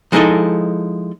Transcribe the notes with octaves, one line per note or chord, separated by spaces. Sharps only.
F3 G#3 D#4 E4 A4 D#5